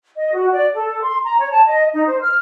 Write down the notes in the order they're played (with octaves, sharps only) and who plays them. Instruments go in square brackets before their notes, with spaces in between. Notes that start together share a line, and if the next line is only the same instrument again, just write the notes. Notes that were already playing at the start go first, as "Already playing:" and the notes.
[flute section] D#5
F#4
D5
A4
C6
A#5
C#5
A5
D#5
D#4
C5
F6